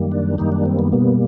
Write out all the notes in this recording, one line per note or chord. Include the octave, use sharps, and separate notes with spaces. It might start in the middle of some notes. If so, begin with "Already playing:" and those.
Already playing: F#2 D#3 G3 A#3
D4
F#2 D#3 G3 A#3 D#4
D4
C4
B3
B2 G3 A#3 B3